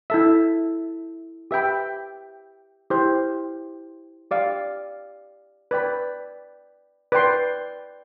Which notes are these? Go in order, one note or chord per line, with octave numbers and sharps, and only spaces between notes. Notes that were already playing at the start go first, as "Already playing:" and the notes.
E4 A4 E5
G4 B4 E5 G5 B5
E4 G4 C5
G4 D5 F5
B4 D5 G5 B5
B4 D5 G5 C6